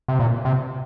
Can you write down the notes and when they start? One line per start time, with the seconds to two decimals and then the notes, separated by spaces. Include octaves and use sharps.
0.08 C3
0.19 A#2
0.45 C3